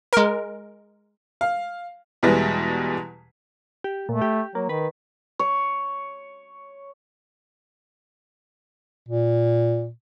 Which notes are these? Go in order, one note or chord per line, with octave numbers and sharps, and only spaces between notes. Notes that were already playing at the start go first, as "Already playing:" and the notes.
G#3 A#4
F5
E2 B2 E3 G3 G#3
G4
A#2 A3
G4
F#3 A#3
D#3 B4
C#5
A#2